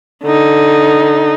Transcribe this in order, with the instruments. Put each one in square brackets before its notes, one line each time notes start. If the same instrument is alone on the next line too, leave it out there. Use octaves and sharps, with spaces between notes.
[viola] D3 D#4